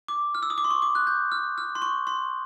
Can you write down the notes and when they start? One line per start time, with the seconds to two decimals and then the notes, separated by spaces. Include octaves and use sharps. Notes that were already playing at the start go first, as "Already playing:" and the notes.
0.08 D6
0.35 F6
0.43 E6
0.50 D#6
0.58 D6
0.64 C6
0.71 C#6
0.82 D6
0.95 F#6
1.07 G6
1.32 F6
1.58 F6
1.75 C6
1.82 C#6
2.07 C6